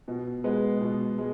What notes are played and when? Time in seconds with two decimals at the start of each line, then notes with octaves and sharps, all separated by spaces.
0.08 B2
0.44 G#3 B3
0.81 B2
1.18 G#3